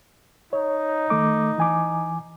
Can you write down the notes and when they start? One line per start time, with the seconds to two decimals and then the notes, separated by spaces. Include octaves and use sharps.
0.53 D#4 C#5
1.10 D#3 A3 D6
1.58 E3 G#5 D6